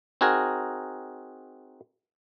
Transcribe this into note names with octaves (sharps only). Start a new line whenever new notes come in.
C4 D#4 F#4 G#4 A#4